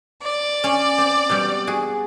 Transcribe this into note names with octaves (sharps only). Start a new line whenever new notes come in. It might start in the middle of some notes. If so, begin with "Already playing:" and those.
D5
C#4 C#5 F5
C4
B2 G3
F#4 G#4